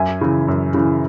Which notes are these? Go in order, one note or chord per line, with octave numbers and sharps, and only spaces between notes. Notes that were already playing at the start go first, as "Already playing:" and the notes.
Already playing: F#2 E5 G#5
C#3 E3
F#2
C#3 E3